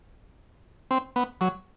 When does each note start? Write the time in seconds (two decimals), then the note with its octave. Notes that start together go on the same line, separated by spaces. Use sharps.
0.91 C4
1.16 B3
1.41 F#3